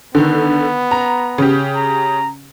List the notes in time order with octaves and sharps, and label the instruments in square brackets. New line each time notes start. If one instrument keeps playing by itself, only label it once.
[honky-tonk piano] D3 D#3 [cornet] B3
[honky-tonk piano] A#5
C#3 G4
[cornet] A#5